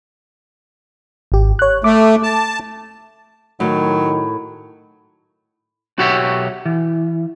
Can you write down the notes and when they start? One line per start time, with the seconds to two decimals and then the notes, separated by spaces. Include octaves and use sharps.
1.32 G#1 G4
1.59 C#5 F#6
1.84 A3 D6
2.23 A5
3.60 A2 D#3 F#3
5.98 B1 F#4 G4 C#5 E5
6.66 E3